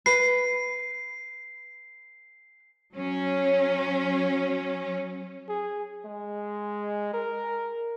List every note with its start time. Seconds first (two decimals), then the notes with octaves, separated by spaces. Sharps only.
0.06 B4 C7
2.94 F#3 C#4
5.49 G#4
6.05 G#3
7.14 A#4